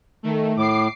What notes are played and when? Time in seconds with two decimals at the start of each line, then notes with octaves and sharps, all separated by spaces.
0.23 D#3 A3
0.57 A2 D6 C7